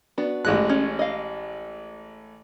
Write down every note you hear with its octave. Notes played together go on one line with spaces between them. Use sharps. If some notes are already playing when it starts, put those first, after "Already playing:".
B3 D4 F#4
A1 G#3 F#6
C#4
D#5 F5